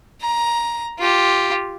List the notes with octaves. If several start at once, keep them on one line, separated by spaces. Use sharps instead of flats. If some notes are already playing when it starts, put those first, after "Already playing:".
A#5
F4 G4